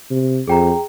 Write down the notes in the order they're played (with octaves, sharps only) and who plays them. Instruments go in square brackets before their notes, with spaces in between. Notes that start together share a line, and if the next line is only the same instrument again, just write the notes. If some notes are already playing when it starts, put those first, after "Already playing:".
[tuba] C3
[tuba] F2 [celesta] G#4 G5 A#5